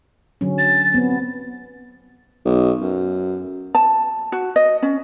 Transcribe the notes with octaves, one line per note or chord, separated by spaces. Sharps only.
D3 F#3 C#4
A6
B3 C4
B1
F#2
A5
F#4
D#5
C#4